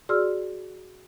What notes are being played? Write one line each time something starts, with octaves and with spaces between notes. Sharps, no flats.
F#4 G#4 D5 C6 E6 F6